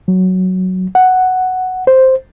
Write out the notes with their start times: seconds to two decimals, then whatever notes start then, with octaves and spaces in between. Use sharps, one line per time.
0.08 F#3
0.95 F#5
1.87 C5